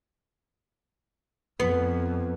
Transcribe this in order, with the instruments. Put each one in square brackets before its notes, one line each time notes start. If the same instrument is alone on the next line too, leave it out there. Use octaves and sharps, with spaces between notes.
[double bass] F2 [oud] B3